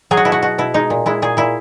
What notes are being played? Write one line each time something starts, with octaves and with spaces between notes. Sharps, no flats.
F#3 G#4
F#4
B2 E4
F#4
B2 F#4
B2 E4
G#3 D#4
A#2
G#3 E4
A#2 G#4
A#2 E4